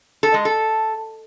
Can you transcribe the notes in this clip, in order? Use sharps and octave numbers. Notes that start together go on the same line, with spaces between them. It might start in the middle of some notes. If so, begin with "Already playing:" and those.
A4
G#3
A4